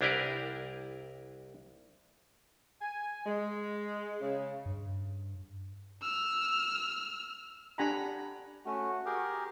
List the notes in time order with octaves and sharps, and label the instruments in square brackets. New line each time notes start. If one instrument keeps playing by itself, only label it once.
[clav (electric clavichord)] C2 D4 E4 G4 A#4 B4
[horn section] G#5
G#3
C#3
[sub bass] G2
[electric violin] E6 F6
[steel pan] D4 G4 F#5 G#5 A#5 B5
[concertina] A3 C#4 [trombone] F#4
[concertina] G4 G#4 A#4